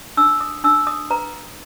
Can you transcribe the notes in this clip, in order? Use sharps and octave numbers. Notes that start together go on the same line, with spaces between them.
D4 E6
D#6
D4 E6
D#6
B4 A#5